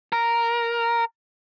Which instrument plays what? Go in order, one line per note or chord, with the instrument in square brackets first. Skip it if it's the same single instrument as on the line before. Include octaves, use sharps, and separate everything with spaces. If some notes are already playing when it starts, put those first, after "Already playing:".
[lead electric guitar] A#4